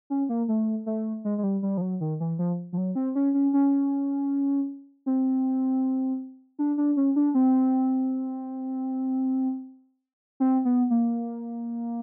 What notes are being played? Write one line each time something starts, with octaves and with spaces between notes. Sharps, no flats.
C#4
A#3
A3
A3
G#3
G#3
G3
G3
F3
F#3
D#3
E3
F3
F3
F#3
C4
C#4
C#4
C#4
C4
D4
D4
C#4
D4
C4
C4
B3
A#3